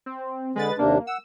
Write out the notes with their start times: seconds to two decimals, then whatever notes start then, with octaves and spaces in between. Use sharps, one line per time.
0.06 C4
0.56 D3 G#3 B4 A6
0.79 D#2 C3 A#3 D4
1.07 F#5 E6